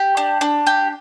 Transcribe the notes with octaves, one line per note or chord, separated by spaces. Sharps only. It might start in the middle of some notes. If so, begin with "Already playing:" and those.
Already playing: G4
D4
D4
G4